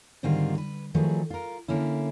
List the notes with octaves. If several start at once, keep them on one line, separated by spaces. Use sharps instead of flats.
G#2 D3 D#3 G3 C4 F4
B4
D#3 F3 F#3 A3 G#4 B4
F4 A#4
D3 A#3 C#4 E4